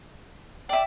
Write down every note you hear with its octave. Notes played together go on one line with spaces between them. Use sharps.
D5 E5 G5